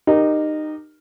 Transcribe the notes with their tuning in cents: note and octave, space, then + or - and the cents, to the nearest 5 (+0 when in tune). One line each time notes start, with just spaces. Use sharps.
D#4 -20 G4 +0 A#4 +0